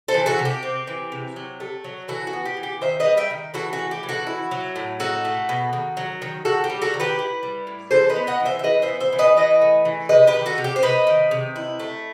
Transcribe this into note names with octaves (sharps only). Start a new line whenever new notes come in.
A4 C5
E3
F#4 A4
C3
G4
C4
E3
C3
F#3
A3
F#3
E3 F#4 A4
F#4
B3
G4
E3
G4
D#3 C5 E5
B4 D#5
G3
E5 G5
D#3
E3 F#4 A4
F#4
A3
G4
E3
F#4 A4
E4
F#3
A2
D#4 F#4 A4
A3
B2
D#3
F#3
D#3
D#3 F#4 A4
G4
G3
F#4 A4
D#3
G4 B4
E4
G3
A2
E3 A4 C5
B4 D#5
B3
D#5 F#5
E3
C5 E5
E5
E3 B4 D#5
C5 E5
B3
C5 E5
E3
B4 D#5
E3 B4 D#5
A3
E3
C3 B4 D#5
G4 B4
D#3
F#4 A4
C3
G4
C5
C3 B4 D#5
D#3
C3
E4
A3